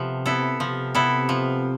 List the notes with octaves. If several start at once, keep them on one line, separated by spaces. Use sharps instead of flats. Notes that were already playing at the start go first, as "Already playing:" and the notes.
Already playing: C3 F3 B3 A4
B3 E4 A4
C3 F3
B3 E4 A4
F3